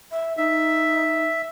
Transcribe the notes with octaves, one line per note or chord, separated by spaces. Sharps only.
E5
D#4 E5